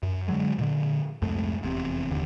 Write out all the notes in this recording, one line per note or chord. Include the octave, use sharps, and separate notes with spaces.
F#2
D3 D#3 F#3 G#3
A#2 D3
C2 F2 G#2 A3
F1 E2 C3
F1 D#2 D3